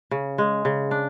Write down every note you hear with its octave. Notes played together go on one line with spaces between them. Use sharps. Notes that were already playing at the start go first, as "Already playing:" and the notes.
C#3
G#3
C#3
D4